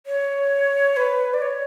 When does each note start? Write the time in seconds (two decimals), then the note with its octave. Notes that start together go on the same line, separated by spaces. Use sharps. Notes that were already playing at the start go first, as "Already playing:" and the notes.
0.07 C#5
0.97 B4
1.34 D5
1.42 C#5